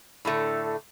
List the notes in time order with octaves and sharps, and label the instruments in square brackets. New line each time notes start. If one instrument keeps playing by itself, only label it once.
[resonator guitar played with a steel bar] A2 D3 A3